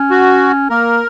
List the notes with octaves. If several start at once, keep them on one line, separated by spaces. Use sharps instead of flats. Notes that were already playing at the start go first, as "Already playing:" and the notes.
Already playing: C#4
F#4
A#3 A#4